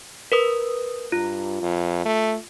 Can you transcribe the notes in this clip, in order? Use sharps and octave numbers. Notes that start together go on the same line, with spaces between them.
A#4 B4 D#6
G2 F4
F2
A3